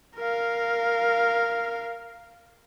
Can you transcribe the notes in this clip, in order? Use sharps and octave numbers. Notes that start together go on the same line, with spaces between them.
A#4 F5